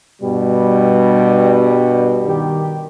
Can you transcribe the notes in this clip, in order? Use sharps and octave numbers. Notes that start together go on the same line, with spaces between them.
G2 B2 G3
D#3 G4